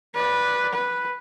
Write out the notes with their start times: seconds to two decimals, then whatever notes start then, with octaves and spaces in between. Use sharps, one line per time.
0.15 B4 D5
0.74 B4